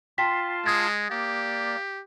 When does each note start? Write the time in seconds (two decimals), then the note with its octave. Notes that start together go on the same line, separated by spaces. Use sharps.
0.18 F4 G5 A5 C6 B6
0.66 G#3 D#6 G#6 A6
1.10 A#3 G4 D5